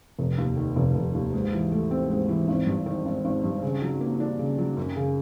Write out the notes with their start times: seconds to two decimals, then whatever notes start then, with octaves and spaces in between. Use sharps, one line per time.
0.19 F1
0.38 D#2
0.57 D#3
0.76 F1
0.95 F1
1.14 D#2
1.34 G#2
1.53 E3
1.72 A3
1.91 C4
2.10 G#2
2.29 E3
2.48 G#1
2.67 G2
2.86 D#3
3.05 G#1
3.25 G#1
3.44 G2
3.62 C#3
3.82 F#3
4.01 A#3
4.20 D4
4.39 C#3
4.58 F#3
4.77 F#2
4.96 C#3